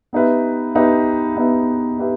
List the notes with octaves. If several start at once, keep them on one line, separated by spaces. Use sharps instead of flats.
B3 D#4 G4 B4 E5
B3 D#4 G4 B4 E5
B3 D#4 G4 B4 E5
B3 D#4 G4 B4 E5